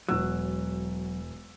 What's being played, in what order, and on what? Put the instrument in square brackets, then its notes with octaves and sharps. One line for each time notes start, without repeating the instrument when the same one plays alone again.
[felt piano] E1 E6 [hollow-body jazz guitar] F#3